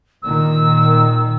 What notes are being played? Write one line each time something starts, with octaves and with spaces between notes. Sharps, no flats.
A#2 D#3 E6